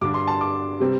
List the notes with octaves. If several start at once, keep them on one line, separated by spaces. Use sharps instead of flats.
G2 D3 G3 D4 D6
C6
A5
D6
C3 G3 C4